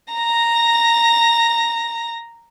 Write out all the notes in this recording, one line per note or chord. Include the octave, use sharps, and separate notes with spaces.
A#5 A#6